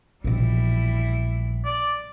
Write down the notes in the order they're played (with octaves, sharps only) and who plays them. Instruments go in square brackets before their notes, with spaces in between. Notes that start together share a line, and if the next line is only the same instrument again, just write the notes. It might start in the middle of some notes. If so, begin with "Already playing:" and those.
[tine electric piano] A#1 [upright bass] B2 E3 [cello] G3 E4
[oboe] D5